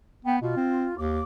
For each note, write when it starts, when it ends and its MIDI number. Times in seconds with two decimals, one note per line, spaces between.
0.25 0.40 59
0.25 0.36 79
0.42 0.52 47
0.42 0.95 65
0.57 0.87 60
0.98 1.21 39
0.98 1.22 86